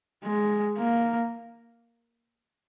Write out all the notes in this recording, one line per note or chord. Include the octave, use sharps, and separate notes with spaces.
G#3
A#3